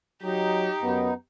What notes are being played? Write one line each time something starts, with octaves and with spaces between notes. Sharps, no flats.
F#3 D#4 G4
F#2 B3